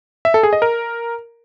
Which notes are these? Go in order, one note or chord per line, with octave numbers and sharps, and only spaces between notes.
E5
A4
G#4
D#5
A#4